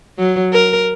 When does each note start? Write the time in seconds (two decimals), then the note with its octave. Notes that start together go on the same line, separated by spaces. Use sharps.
0.19 F#3
0.53 A#4